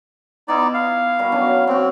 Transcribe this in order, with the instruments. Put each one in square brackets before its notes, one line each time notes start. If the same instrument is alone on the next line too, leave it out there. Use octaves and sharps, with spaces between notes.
[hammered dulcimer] B3 E4 [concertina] D#4 D5
[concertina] F5
[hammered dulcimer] B2 G3 A#4
F#3 C#4 D4
[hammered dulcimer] A#3 F#4 [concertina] C4